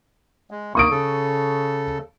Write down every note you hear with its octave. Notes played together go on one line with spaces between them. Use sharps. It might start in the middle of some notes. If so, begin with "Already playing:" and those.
G#3
A#3 C#6 D#6 D7
C#3 A4